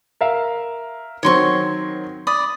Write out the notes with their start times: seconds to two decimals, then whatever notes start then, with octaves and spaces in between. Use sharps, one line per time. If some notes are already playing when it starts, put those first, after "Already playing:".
0.21 A#4 E5 F5
1.23 D#3 F#3 C4 C#5 C6 C#6
2.27 D5 B5 D#6